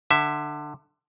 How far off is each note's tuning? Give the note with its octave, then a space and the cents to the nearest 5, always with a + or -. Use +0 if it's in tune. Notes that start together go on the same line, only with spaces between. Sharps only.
D3 +20 E5 +0